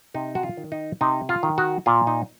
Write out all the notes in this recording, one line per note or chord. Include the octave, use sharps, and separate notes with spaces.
C3 D#4
F#4
F4
D#3
D#4
C3 D#4
F4
D#3
F#4
A#2 F4
D#4